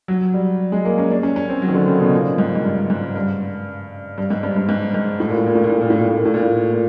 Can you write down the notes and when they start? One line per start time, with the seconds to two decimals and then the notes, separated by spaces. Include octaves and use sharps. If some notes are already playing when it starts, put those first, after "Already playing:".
0.08 F#3
0.34 G3
0.72 G#3
0.85 A#3
0.98 C#4
1.10 D4
1.23 C#4
1.36 C#4
1.49 C4
1.62 F#3
1.68 D#3
1.74 D3
1.87 C#3
2.00 B2
2.13 A#2
2.38 G#2
2.55 G#2
2.64 G2
2.90 G#2
3.15 G2
4.18 G2
4.30 G#2
4.43 G2
4.56 G2
4.69 G#2
4.94 G#2
5.20 A2
5.29 A#2
5.37 A2
5.46 A#2
5.55 A2
5.64 A#2
5.73 A2
5.81 A#2
5.90 A2
5.99 A#2
6.08 A2
6.16 A#2
6.25 A2
6.34 A#2
6.43 A2
6.73 A#2